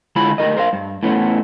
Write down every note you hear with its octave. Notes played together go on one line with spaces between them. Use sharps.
D3 G#3 E4 F4 C#5 B5
D2 G3 A#4 D#5
A#4 C5 D#5 F5
G2
A2 B3 C#4